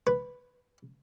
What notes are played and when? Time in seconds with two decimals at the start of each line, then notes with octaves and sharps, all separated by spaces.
0.07 B4